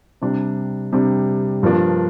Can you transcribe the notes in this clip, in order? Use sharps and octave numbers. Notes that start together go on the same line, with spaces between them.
C3 G3 D4
C3 G3 D4
G2 F3 A#3 D4